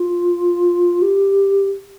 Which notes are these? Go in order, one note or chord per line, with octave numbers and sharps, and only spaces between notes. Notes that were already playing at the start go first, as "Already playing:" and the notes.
Already playing: F4
G4